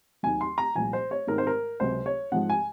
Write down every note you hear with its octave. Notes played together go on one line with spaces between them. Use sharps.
D#2 D#3 F#3 G#5
C6
A#5
C2 A#2 F3 G#5
C5
C#5
G#2 D#3 G#3 C4 A#4
C5
A#4
C#2 C3 F#3 C5
C#5
G#2 F3 G#3 F#5
G#5